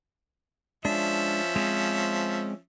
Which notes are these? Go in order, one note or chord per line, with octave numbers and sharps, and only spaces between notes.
F3 G#3 C#4 D4 E5
G#3 C4